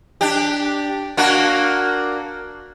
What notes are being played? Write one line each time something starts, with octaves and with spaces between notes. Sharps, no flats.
D4 G4
A#3 D4 F#4